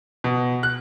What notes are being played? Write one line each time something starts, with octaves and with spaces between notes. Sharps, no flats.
B2
F#6